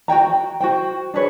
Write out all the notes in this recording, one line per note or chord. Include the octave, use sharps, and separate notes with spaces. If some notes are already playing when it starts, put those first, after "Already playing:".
F#4 C#5 G5 A#5
G5
F#4 C5 G5
D4 G#4 B4 C#5